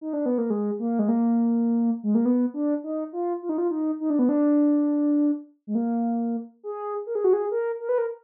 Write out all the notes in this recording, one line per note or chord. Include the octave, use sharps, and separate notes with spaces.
D#4
D4
B3
A#3
G#3
A#3
G#3
A#3
G#3
A#3
B3
D4
D#4
F4
F4
D#4
F4
D#4
D#4
D4
B3
D4
G#3
A#3
G#4
A#4
G#4
F#4
G#4
A#4
A#4
B4
A#4